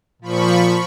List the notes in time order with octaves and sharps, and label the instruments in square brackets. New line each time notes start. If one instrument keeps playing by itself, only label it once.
[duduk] A#2 [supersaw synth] F3 B5 C#6